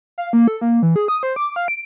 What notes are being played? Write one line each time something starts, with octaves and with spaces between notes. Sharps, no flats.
F5
A#3
A4
A#3
E3
G#4
D#6
C5
D6
F5
D7